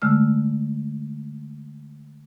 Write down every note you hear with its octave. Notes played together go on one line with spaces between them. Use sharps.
D3 G#3 A3 E6 F6